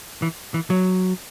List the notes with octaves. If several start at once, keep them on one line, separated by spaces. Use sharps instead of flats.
E3
E3
F#3